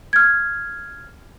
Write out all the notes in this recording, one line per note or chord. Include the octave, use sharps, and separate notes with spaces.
F6 G#6